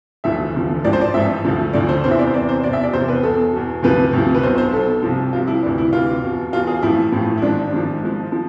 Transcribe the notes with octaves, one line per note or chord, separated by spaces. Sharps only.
E1 D2 D3 F3 E5
E1 D2 D3 F3
A1 G#2 F3 D5
C5
D5
A1 G#2 F3 E5
D2 D3 F3
D2 D3 F3 D5
C5
E2 C3 E3 C5
E5
D5
C5
E2 C3 E3 D5
C5
F1 E2 B2 D5
E5
D5
F1 E2 B2 C5
B4
E2 B2 A4
E2 B2
D2 C3 F3 B4
D2 C3 F3
B4
B1 B2 C5
C5
B1 B2 A4
C2 C3 F3
C2 C3 F3 F4
E4
D2 C3 E3 D4
E4
D2 C3 E3 F4
E2 B2
E2 B2 F4
G#4
A1 A2 F3 E4
A1 A2 F3
E4
G#1 G#2 F3 D4
G#1 G#2 F3
G#1 G#2 F3
F3